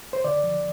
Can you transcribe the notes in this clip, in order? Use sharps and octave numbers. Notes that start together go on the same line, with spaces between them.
C5
D3 D5
F3